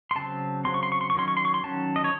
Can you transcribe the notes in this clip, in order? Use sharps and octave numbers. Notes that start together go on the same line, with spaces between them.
C6
C#3 F#3 C4 A5
C#3 F#3 C4 C6
C#6
C6
C#6
C6
C#6
D#3 F#3 C#4 C6
C#6
C6
C#6
C6
D#3 F#3 C#4 A5
D#5
C#5